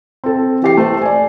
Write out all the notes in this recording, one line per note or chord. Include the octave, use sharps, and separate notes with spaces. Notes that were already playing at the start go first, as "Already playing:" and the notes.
C4 A4
E3 G4 C7
A3 C5
D5 G#5